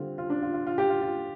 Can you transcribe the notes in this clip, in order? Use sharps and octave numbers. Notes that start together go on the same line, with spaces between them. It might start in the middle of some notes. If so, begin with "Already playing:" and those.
Already playing: D3 G3 C4 F4
F4
D4
F4
F4
F4
G4
F4
F4